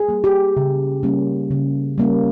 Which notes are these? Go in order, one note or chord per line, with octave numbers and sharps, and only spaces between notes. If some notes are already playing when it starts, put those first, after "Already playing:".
Already playing: G#4
G3 A#3
G4
C#3
G3 A#3 C#4
C#3
G3 A#3 C#4